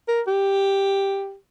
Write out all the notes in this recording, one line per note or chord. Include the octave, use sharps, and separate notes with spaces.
A#4
G4